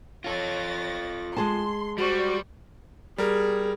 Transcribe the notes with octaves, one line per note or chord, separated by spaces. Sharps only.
F4 A4 C#5 A6 A#6
G#3 G#4 A5 C6
G3 F#4 C5 D5 C#6
G3 G#4 A#4